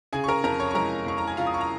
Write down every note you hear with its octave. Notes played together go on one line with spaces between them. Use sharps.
C#3 G#4 G#5
C#6
A#4 A#5
F2 A#4 A#5
C#5 C#6
C#6
G#3 A#4 A#5
F2 C#6
A#5
G#5
C#3 F4 F5
D#6
C#6
A#5